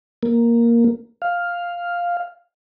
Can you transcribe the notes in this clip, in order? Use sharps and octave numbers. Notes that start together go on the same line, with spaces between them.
A#3
F5